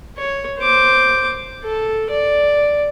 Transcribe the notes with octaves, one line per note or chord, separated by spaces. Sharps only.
C#5
C5 D6
A4
D5